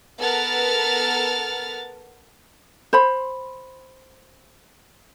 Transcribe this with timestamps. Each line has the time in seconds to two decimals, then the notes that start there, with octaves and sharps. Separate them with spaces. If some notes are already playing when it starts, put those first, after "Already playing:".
0.19 B3 A4 A#4 F#5 F6 A6
2.93 C5 B5